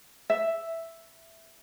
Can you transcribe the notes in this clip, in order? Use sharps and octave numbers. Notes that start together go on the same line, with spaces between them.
E5